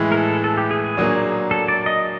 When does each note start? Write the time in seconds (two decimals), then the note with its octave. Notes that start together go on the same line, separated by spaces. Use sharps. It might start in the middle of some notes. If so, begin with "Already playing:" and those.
Already playing: A2 E3 G#3
0.12 A#4
0.17 A4
0.44 A4
0.57 G4
0.71 G#4
0.84 G#4
0.97 A#2 F#3 A#3 D4
1.51 A4
1.68 D5
1.86 D#5